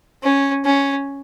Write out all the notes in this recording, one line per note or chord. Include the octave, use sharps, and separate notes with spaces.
C#4
C#4